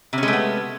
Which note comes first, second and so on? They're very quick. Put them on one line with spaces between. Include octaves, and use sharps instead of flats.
C3 C#4 G#3 A3 B3